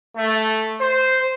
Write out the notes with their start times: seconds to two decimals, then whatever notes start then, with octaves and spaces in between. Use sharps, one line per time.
0.17 A3
0.81 C5